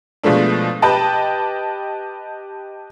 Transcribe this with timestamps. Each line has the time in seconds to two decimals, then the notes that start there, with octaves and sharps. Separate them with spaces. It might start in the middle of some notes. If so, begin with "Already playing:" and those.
0.23 B2 F3 G#3 A3 D4
0.82 G4 B4 D#5 G5 A5